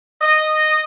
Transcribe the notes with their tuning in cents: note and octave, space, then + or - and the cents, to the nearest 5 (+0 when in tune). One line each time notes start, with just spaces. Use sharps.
D#5 -10